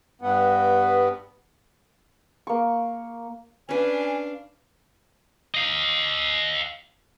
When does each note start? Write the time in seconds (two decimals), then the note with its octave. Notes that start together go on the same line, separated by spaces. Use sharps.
0.21 G2 B3
2.47 A#3 C#6
3.69 C#4 D4 B4 F5 G#5
5.55 D#5 F5